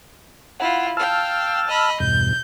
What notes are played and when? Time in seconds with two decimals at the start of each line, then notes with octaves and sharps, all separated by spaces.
0.60 E4 F4 F#5
0.97 F5 G5 A5 E6 F6
1.68 D#5 B5
2.00 E2 G2 B2 G6